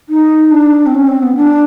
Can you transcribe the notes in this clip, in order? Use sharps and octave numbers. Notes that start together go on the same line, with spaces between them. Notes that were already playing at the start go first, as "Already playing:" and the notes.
D#4
D4
C4
C#4
C4
B3
D4